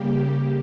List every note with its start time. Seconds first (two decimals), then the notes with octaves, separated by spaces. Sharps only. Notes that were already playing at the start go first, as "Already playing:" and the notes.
Already playing: C#3 G3 A#3 G4